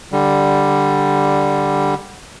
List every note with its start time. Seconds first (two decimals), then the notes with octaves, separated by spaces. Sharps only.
0.12 D3 G3